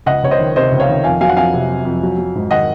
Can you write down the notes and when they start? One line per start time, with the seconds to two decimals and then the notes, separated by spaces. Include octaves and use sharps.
0.06 C#2 D#5 F#5
0.23 C#2 C#5
0.31 C5 D#5
0.39 D#3
0.56 C3 C5 D#5
0.72 C#2
0.80 C#5 F5
0.89 D#3
1.04 F2 F5 G#5
1.21 F#3 F5 G#5
1.29 F#5
1.37 F2 F5 G#5
1.54 C3
1.70 F#3
1.85 F2
2.03 F#3
2.18 F#3
2.35 G#2
2.51 D#3 D#5 F#5